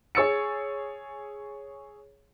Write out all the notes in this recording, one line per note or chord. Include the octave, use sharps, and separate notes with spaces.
G#4 C#5 E6 A6 C#7